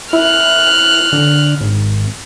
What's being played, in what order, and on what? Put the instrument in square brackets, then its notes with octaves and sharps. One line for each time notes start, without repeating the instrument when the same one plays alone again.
[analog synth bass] E4 [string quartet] F6 F#6
[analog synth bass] D3
G#1